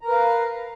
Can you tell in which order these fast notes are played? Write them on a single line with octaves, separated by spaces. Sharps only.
A#5 A#4 B4 F5